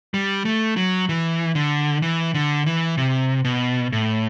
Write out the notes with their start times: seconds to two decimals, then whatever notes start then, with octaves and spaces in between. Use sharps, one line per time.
0.14 G3
0.45 A3
0.76 F#3
1.09 E3
1.55 D3
2.02 E3
2.34 D3
2.66 E3
2.98 C3
3.45 B2
3.92 A2